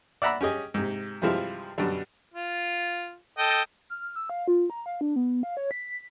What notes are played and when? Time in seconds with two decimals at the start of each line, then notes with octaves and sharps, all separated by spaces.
0.22 D5 E5 F#5 A#5 B5 E6
0.41 C#4 G4 G#4 D#5
0.74 G#2 C3
1.22 G2 C3 F3 G#3 E4 F4
1.78 F#2 B2 D3 G3
2.34 F4
3.38 A4 D#5 G5
3.90 F6
4.16 E6
4.30 F5
4.48 F4
4.70 A#5
4.86 F5
5.01 D4
5.16 B3
5.43 F5
5.57 C#5
5.71 B6